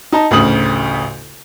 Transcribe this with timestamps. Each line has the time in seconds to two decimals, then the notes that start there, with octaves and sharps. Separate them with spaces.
0.12 D#4 A5 A#5
0.31 A1 D2 C#3 D#6 F#7